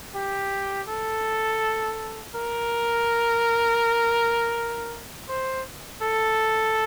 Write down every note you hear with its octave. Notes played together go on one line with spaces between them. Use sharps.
G4
A4
A#4
C5
A4